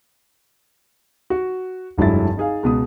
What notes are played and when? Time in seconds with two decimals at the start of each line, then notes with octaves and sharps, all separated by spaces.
1.30 F#4
1.98 F1 G2 F#3 G#3 E4 A6
2.37 D#4 G#4 F5
2.63 C#2 B2 D#6